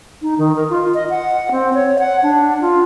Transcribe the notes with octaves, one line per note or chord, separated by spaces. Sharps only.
D#4
D#3
A#4
F4
D#5
F#5
C4
C#5
F#5
D4
F4